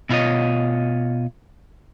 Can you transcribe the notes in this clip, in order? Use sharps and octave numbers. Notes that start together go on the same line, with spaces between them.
B2 E4 F4 C#5 D#5